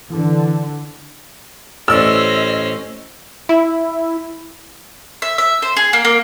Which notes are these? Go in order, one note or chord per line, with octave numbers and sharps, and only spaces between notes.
D3 E3
A1 C#4 C5 D5 D#5 E6
E4
E5
E5
C5
G#4
A#3
A#3